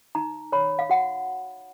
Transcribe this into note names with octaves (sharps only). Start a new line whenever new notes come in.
D#4 A#5
C#5 B5
F5
F#4 F#5